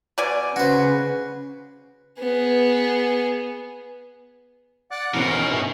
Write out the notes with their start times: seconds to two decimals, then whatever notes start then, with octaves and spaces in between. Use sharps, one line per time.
0.18 B2 D5 G#5
0.56 C#3 F#4 B4 C5
2.19 B3 G#4
4.91 D5 F#5 F#6
5.14 D2 B2 D#3 E3 C#4 A#4
5.49 G1 E5